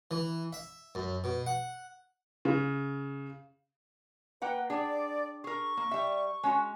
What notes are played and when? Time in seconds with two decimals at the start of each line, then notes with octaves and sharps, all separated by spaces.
0.11 E3
0.53 E5
0.95 F#2
1.24 B2
1.46 F#5
2.45 C#3
4.42 A#3 B4 F#5 G5
4.70 D4 G#4 D5
5.44 G#4 A#4 C#6
5.77 A#3
5.91 G3 E5
6.43 G#3 C#4 F#4